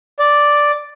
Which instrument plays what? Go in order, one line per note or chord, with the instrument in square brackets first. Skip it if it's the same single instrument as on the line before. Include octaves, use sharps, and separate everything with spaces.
[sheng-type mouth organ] D5